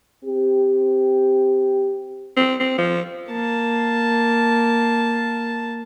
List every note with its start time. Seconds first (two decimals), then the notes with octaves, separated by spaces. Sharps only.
0.25 C4 G4
2.37 C4
2.60 C4
2.78 F3
3.30 A#3 A5